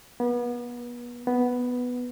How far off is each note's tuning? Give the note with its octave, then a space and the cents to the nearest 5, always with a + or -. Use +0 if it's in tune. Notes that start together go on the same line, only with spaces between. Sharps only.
B3 -35
B3 +0